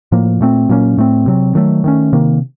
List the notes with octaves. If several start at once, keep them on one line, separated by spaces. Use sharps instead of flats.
A2 F3 A#3
A#2 A3 C4
A#2 F#3 A#3 C#4
A2 A3 C4
C3 F#3 C4
D#3 F#3 A3
D#3 A3 C#4
C3 D#3 A#3